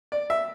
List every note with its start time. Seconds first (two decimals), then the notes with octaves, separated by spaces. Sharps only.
0.12 D5
0.30 E5